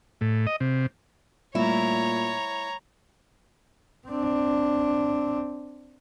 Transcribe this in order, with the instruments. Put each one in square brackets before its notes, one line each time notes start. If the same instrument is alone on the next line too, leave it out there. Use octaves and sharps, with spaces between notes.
[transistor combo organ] A2
D#5
C3
[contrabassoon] A#2 [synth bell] G3 A3 [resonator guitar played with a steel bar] E4 [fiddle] C#5 A#5
[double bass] C4 D4